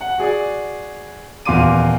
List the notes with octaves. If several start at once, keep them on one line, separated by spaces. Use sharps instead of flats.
F#5
F#4 G#4 D5
D#1 E2 F5 C6 D6 D#7